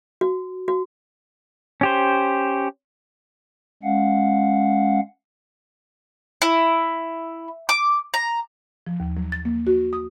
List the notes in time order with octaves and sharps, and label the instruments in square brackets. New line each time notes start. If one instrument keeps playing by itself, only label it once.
[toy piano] F#4
F#4
[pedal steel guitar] C#4 G4 C5
[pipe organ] G#3 C#4 F5 F#5
[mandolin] E4
D6
A#5
[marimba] F3
D#2
F#3
A6
A#3
F#4
D#6